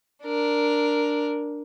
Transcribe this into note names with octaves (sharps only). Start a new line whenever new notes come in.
D4 A#4